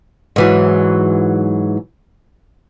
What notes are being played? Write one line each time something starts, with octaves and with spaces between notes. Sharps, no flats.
G#2 E3 F#3